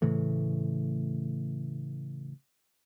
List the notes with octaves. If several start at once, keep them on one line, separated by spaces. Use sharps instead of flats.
A2 C#3 E3 A3